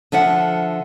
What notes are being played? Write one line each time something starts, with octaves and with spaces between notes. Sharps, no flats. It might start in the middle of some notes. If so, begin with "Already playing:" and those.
D3 F3 E5 F#5